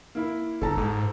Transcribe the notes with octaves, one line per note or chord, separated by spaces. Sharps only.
A#3 E4
G1 A4 A5 A#5
G#2